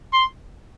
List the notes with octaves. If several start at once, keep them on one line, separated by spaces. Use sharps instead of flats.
C6